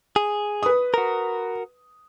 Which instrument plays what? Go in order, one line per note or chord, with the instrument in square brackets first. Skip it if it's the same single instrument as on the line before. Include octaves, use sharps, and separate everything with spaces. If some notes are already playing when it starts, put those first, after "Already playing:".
[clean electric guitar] G#4
[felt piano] B4 D#6
[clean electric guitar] F#4 A#4